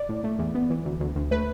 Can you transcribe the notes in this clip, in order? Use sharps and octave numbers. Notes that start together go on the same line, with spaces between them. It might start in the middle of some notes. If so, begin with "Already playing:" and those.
Already playing: D5
A2
A3
E2
B3
E3
D2
D2
D2
A3 B4